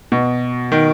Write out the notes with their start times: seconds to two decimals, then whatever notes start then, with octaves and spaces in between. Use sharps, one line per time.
0.12 B2
0.72 D#3